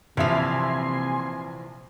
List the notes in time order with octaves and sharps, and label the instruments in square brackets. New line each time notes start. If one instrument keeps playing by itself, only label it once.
[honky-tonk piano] A#1 E5 F7 [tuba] C3 [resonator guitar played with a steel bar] E3 F3 [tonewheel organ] G#5 C6